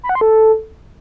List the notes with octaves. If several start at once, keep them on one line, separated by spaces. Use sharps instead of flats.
B5
F#5
C6
A4